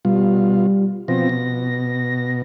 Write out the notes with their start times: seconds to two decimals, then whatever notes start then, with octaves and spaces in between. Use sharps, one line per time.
0.05 B2 G3 F4
1.08 B2 F3 C4 A#6
1.29 B2